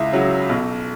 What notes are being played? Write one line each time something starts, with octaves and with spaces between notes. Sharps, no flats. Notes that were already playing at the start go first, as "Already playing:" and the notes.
Already playing: C#2 E4 E5
C#3 F#3
B1